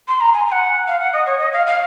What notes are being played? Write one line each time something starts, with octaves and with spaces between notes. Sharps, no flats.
C6
A#5
G#5
G#5
F#5
F5
F#5
D#5
C#5
D#5
F5
F5